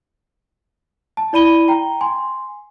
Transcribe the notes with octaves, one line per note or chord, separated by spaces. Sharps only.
A5
E4 D5 B5 D#7 G7
G5 A#5
G#5 C6